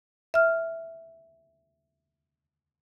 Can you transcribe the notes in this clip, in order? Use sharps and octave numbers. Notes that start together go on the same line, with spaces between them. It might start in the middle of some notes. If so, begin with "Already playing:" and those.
E5 F6